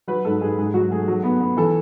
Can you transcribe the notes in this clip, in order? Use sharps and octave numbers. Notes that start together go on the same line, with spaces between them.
F#3 B4
G#2 A4
G#2 G#4
G#2 G#4
F#3 F#4
A3 G#4
F#3
B3
B3
E3 A4